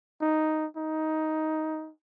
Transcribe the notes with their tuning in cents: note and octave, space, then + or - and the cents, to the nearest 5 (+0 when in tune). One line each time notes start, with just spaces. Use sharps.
D#4 +0
D#4 +10